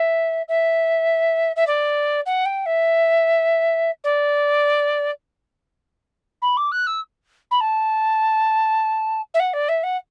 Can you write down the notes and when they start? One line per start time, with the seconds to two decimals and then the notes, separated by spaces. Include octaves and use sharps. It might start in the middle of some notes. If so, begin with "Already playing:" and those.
Already playing: E5
0.48 E5
1.56 E5
1.67 D5
2.26 F#5
2.45 G5
2.66 E5
4.04 D5
6.42 B5
6.57 D6
6.72 F#6
6.87 E6
7.51 B5
7.60 A5
9.34 E5
9.39 F#5
9.53 D5
9.68 E5
9.83 F#5